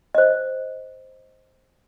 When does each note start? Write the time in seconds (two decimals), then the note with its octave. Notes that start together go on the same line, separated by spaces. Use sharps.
0.15 C5 D#5